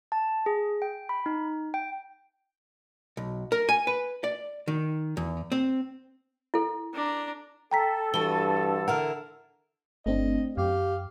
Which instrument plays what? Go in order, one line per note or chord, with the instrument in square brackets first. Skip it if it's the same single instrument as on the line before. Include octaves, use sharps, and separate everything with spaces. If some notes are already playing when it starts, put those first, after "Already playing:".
[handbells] A5
G#4
G5
B5
D#4
G5
[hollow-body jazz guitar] B1
A#4
G#5
B4
D5
D#3
E2
C4
[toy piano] E4 A4
[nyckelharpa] D4 A#5
[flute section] A4 [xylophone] G5 A#5 B6
[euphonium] G2 [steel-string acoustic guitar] E3 F#4 [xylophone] G7
[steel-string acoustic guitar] D3 E4 A#4 [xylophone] F#5 F6
[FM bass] G1 [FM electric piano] A3 C4 D4 [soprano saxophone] D#5
[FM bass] F#2 [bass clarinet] G4 [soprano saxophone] F5